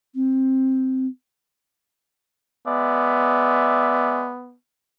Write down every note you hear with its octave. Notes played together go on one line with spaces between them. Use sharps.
C4
G#3 B3 D5 E5